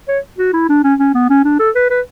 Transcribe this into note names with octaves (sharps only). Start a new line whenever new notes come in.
C#5
F#4
E4
D4
C#4
C#4
B3
C#4
D4
A4
B4
B4